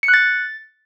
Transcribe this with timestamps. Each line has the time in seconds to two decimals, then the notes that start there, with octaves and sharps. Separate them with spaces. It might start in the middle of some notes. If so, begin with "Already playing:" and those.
0.03 C#7
0.08 F#6
0.14 A6